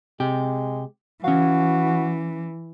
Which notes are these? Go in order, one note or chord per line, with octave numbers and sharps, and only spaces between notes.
C3 G#3 G4
E3 C#4 F#4 F5